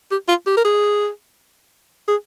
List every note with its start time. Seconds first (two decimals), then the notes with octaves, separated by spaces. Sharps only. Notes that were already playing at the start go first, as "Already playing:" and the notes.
0.11 G4
0.28 F4
0.47 G4
0.57 A#4
0.65 G#4
2.08 G#4